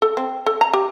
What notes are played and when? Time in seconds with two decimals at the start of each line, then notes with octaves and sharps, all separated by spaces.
0.02 A4
0.17 C4
0.46 A4
0.61 A#5
0.73 G4